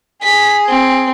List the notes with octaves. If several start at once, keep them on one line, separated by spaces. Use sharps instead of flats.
G#4 B6
C4